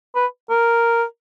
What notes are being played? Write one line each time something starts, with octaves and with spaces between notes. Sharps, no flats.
B4
A#4